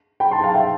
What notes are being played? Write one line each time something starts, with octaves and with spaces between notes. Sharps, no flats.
G5 B5
A5 C6
F5 A5
E5 G5